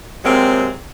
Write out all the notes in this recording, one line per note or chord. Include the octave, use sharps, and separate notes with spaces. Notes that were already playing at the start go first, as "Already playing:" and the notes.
C3 F#3 G#3 A#3 C4